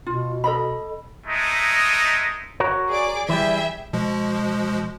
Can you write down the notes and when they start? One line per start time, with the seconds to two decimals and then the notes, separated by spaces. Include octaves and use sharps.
0.06 B2 F4
0.44 A4 D#5 B5
1.27 G#3 A3 D#4
2.60 F#4 A#4 C#5
2.90 G#4 D5 D6
3.29 E3 G3 G#4 E5 G5
3.93 B2 F3 G#3